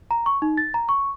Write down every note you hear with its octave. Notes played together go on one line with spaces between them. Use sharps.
A#5
C#6
D#4
A6
A#5
C#6